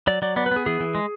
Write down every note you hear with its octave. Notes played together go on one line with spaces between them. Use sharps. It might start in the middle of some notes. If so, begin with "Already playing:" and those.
F#3 D5
F#3 D5
B3 D5
B4
B3 G#4
E3 G#4
E3
G#3